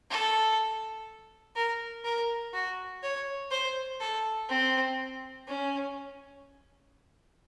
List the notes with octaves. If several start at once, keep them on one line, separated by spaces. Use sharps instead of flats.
A4
A#4
A#4
F#4
C#5
C5
A4
C4
C#4